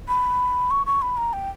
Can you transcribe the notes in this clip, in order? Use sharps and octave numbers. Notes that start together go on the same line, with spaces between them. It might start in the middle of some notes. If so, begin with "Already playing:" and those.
B5
C#6
C#6
B5
A#5
G5